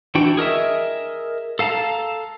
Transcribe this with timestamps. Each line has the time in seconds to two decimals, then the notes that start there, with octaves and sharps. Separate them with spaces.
0.15 E3 D4 F#4 G5
0.37 G#4 A#4 D#5 E5
1.59 A4 F5 A5 A#5